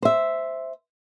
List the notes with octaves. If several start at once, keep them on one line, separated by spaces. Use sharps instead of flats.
C5 E5